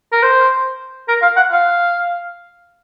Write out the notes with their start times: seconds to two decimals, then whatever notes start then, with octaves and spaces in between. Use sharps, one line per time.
0.12 A#4
0.23 C5
1.08 A#4
1.22 F5
1.37 F#5
1.51 F5